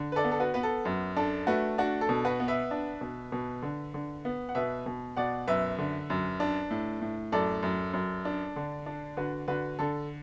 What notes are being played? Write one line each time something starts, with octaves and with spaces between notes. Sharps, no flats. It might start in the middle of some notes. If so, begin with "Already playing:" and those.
Already playing: D3
B4
A4 D5
B3
A4
F#4 B4
B3 B4
A4
F#2
D4 A4
A3 F#4 B4
D4 F#4
A4
B2
F#4 B4
B3
B4 E5
D4
B2
B2
D3
D3
B3
F#5
B2 B4 E5
B2
B2 D5 F#5
F#2 B4 E5
D3
F#2
D4
A2
A2
F#2 A4 D5
F#2
F#2
D4
D3
D4
D3 F#4 B4
D3 F#4 B4
D3 A4